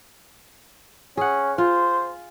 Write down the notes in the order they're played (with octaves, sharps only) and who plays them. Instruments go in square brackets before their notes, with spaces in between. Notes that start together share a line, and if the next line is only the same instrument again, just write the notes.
[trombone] C#4 [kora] G#4 F#5
[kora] F4 [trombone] C5